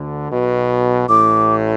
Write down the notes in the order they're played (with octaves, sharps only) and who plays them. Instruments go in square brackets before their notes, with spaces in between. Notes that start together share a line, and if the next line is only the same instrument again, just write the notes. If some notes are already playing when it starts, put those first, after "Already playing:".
Already playing: [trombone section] D2 D3
B1 B2
[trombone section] A1 A2 [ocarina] D6